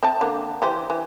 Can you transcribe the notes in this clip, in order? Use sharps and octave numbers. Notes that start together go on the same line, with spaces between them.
C4 E5 A5
D3 A#3
E3 G4 C5
E3